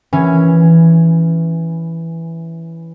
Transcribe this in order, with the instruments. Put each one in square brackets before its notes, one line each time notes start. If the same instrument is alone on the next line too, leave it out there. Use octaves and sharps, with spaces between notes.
[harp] E3 C#4